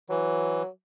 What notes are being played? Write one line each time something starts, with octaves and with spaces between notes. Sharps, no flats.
E3 F#3